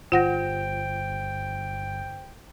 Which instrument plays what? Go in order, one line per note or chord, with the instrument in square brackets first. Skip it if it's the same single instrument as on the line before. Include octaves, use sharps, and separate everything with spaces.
[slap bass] G1 [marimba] F4 F#5 A#6 [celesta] C5 [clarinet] G5